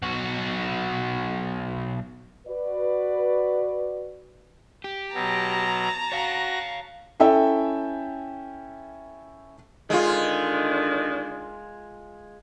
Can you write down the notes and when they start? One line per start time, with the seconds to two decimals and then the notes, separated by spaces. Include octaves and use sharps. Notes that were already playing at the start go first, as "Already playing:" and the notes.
0.02 B1 F#4
2.47 F#4 B4 D5
4.84 G4
5.14 B2 F#3 A5 A#5
6.12 F#4 C#5 F5 A#6
7.20 C#4 E4 A4 E5 G5
9.90 D3 D#3 G#3 D4 F4